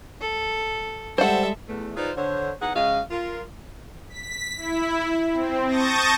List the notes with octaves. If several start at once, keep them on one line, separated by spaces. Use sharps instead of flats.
A4
G3 G#3 A4 C5 E5 F#5
E2 A3
D#4 F4 G#4 B4 C5 D5
D3 C5 C#5
E2 D#4 G#4 F#5
C#3 G#3 F#4 D#5 F5
F4 A#4
B6
E4
C4
A5 C#6 D#6 G6 A6 A#6